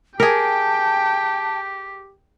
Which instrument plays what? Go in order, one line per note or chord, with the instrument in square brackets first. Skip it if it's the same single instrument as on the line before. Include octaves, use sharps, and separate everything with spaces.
[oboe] G4 [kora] G#4 A#4 [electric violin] G5 [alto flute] A5